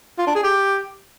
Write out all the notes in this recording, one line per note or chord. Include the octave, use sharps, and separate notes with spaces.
F4
D4
G#4
G4